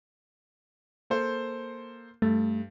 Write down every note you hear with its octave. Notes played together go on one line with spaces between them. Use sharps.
A#3 A4 C5
G2 A3